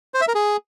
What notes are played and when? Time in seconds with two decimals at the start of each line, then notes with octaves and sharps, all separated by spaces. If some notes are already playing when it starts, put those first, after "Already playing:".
0.14 C5
0.21 E5
0.28 A#4
0.35 G#4